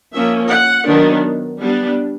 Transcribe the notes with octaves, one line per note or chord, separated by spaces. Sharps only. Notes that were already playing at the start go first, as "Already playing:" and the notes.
F3 A#3 C#4 E5
F#5
D#3 F#3 B3 D4
G3 B3 D4